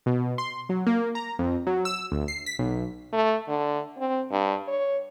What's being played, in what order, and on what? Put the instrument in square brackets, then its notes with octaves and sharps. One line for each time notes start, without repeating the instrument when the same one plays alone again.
[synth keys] B2
C6
F#3
A#3
A#5
F2
F#3
E6
D2
C7
B6
B1
[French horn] A3
D3
C4
G2
C#5